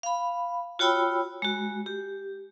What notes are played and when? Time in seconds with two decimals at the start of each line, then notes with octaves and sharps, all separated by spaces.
0.03 F5 B5
0.79 F4 F#4 C#5 G5 B5 E6
1.42 G#3 F#4
1.86 G4